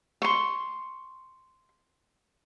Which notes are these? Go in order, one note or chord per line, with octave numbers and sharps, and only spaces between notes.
C6 C#6